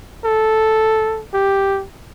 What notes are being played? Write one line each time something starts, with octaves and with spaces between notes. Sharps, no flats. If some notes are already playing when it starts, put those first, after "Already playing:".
A4
G4